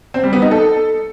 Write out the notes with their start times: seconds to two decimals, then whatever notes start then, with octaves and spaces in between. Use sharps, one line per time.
0.14 C4
0.23 G3
0.33 B3
0.42 D#4
0.51 A4